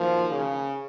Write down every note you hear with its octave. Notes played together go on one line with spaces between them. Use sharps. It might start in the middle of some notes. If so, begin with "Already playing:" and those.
Already playing: D#3 F3 F#3 A#3 F4
C#3